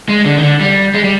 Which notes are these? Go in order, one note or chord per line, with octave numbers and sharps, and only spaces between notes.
G#3
D3
D#3
D3
G3
G#3
G3